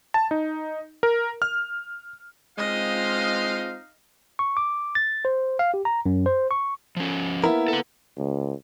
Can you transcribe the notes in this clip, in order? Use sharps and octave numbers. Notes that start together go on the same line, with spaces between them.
A5
D#4
A#4
F6
G#3 C4 D#4 F4 D#5 F5
C#6
D6
A6
C5
F5
G4
A#5
F#2
C5
C#6
F3 C#4
A#3 B3 E4 A#4
A4 F#5
C#2